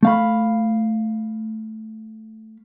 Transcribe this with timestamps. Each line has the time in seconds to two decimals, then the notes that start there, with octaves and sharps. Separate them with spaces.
0.03 A3 F5 B5